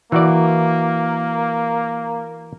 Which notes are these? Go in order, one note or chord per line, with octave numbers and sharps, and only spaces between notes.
E3 A#3 F#4 D5